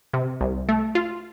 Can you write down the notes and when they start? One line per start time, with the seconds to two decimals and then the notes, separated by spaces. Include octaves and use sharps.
0.14 C3
0.41 C2
0.69 A3
0.95 F4